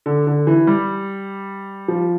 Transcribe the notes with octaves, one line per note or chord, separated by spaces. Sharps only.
D3
D3
E3
G3
F3